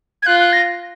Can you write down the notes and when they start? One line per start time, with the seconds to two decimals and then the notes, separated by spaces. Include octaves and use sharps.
0.22 G#6
0.26 F4 F#6
0.40 F#6
0.53 A#6